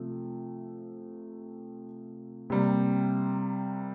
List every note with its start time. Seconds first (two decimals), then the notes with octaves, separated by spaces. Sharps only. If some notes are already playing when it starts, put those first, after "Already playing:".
Already playing: C3 F3 A3
2.50 C3 G3 A#3